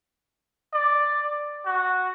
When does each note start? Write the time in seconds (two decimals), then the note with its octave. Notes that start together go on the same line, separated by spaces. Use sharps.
0.73 D5
1.65 F#4